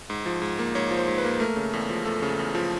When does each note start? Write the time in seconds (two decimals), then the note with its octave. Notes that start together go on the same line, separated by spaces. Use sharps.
0.10 G#2
0.26 F3
0.42 G#2
0.59 A#3
0.75 G#2 C#5
0.91 F3
0.97 C5
1.08 G#2
1.18 B4
1.25 A#3
1.40 A3 A#4
1.56 C#3
1.73 E2
1.90 F3
2.05 A3 A4
2.22 C#3
2.39 E2
2.55 F3